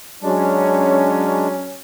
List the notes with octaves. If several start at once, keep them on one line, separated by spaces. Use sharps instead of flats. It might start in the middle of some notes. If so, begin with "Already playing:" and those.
F#3 G#3 C#4 D4